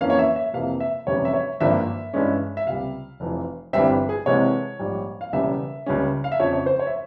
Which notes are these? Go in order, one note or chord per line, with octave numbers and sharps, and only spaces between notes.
F2 E3 A#3 C#4 F5
C#5
E5
E5
F2 C3 E3 A#3 F5
E5
F1 E2 C3 G3 C#4 C#5
E5
C#5
G#1 G2 F3 A#3 E5
G2 E3 G#3 C#4
E5
C#2 C3 G3 F5
F1 F2 E3
G1 G2 E3 G3 C4 E5
G#4
C2 C3 E3 G#3 C4 C#5
A#1 G#2 G3
F5
E1 E2 C#3 G3 E5
C#2 C#3 G3 C#4
F5
E5
F2 C#3 F3 C#5
C#5
C5
C#5
E5